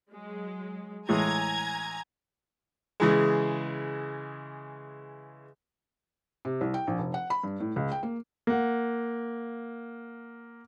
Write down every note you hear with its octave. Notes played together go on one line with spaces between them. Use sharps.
F#3 G#3
A2 E3 G#3 G#5 A#5 G#6
C#3 E3 G#3
C3
C2
G5
A#1
F1
F#5
B5
G2
A2
C#2
G5
A#3
A#3 F#5